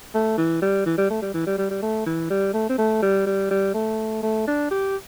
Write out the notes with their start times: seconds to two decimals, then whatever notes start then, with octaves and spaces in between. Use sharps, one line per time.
0.14 A3
0.38 E3
0.62 G3
0.86 E3
0.98 G3
1.10 A3
1.22 G3
1.34 E3
1.47 G3
1.58 G3
1.70 G3
1.82 A3
2.06 E3
2.30 G3
2.54 A3
2.69 C4
2.78 A3
3.02 G3
3.26 G3
3.51 G3
3.74 A3
4.23 A3
4.47 D4
4.71 G4